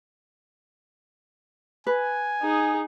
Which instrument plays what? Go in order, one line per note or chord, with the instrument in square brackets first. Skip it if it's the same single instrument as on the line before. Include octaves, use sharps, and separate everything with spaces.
[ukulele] B4 [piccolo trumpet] G#5
[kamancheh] D#4 G#4